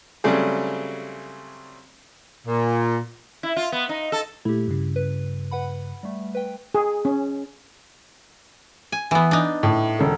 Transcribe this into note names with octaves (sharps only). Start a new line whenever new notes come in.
C#3 F#3 G3 A3 C4 G#4
A#2
E4
F4
B3
D#4
A4
A#2 A3 E4 G4
G2 C#3
B4
B4 F#5 B5
G3 A3
B4 G5
G#4
C#4
G#5
E3 B3
D4 D#4
A2
E1 A4